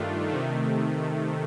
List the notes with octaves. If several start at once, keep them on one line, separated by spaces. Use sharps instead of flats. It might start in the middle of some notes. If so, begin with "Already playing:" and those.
Already playing: G2 D#3 A3 D4 F4
C3 D#3 A3